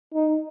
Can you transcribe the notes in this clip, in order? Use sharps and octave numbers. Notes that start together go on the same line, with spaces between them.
D#4